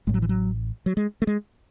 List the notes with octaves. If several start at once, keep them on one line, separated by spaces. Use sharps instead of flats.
A1 A2 G#3
F#3
E3
F#3
F#3
G#3
A3
G#3